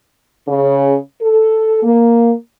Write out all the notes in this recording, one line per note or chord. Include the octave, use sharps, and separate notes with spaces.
C#3
A4
A#3